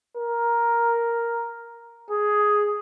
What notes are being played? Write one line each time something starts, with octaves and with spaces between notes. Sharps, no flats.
A#4
G#4